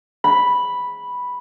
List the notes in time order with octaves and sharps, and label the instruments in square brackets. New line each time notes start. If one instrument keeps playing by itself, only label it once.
[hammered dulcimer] B5